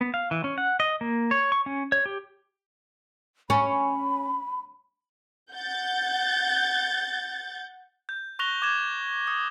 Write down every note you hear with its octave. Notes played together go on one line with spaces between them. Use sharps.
B3
F5
E3
C#4
F#5
D#5
A#3
C#5
C#6
C#4
C#5
G4
C#4 B5
F#5 G6 A6
G6
C#6 F#6 A#6 F7 G7
D6 G#6 E7
D#6